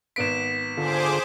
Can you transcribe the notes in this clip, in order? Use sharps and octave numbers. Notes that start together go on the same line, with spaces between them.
G#1 B3 B6 D7 E7
D3 F4 G#4 A4 C5 D6